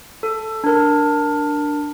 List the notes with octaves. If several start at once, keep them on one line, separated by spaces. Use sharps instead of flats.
A4
D4 A#4